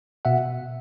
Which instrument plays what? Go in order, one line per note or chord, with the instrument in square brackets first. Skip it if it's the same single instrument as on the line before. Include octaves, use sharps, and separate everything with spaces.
[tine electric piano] B2 E5 F#5